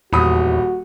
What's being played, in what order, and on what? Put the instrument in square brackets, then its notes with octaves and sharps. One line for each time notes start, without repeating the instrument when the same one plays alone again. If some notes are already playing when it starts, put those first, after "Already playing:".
[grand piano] D#1 B5 D#6 [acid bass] E2 [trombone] F#4